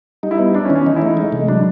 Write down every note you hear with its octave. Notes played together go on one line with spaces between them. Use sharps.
G3 D#4
E4
B3 D#4
D4 E4
C#4
D#3
C#4
E3 D#4
E4
A3 D#4
G#3
C3
F#3 D4